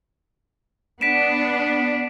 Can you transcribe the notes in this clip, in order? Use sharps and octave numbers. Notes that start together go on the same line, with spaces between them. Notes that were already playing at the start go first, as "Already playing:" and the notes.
B3 D4 B6 D7 E7